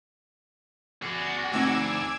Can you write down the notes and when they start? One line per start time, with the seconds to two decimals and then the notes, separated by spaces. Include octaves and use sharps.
1.02 F#4 G#4 D5
1.52 D2 C4 D#4 D6 E6 G#6